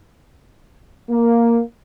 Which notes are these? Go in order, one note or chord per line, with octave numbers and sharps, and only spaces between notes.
A#3